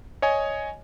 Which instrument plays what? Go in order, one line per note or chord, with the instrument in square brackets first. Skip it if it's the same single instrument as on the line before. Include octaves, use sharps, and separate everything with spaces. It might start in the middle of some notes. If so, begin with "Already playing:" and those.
[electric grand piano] C#5 D#5 G#5